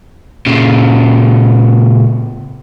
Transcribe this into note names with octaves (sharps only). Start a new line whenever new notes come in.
A#2 C#3